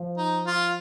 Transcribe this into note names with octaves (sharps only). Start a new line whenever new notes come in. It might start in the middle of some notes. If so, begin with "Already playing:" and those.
Already playing: F3
D#4
F4